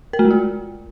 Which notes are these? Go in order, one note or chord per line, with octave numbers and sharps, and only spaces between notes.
A#4
A3
G#3
F4